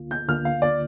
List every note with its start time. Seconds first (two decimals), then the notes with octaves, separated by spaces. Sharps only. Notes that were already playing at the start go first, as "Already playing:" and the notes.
Already playing: D2 D3 A#3 F4
0.11 G6
0.28 D2 D3 A#3 F4 F6
0.45 F5
0.62 D5